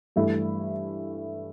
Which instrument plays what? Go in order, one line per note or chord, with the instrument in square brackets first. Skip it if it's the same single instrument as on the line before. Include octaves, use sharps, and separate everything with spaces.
[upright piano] G2 E3 A3 E4